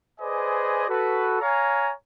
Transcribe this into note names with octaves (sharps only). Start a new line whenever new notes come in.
G#4 B4 C5 D5 D#5 G#5
F#4 A4 B4
C#5 F5 G#5 A#5